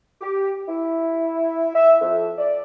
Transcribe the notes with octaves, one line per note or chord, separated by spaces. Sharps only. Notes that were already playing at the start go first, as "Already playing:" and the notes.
G4
E4
E5
F2
D5